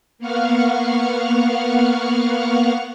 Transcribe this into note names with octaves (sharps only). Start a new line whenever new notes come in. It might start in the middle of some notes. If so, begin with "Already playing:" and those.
A#3 B3 F5 F#5 C#6 F6